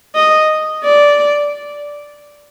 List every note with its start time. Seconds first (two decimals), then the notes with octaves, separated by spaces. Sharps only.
0.15 D#5
0.84 D5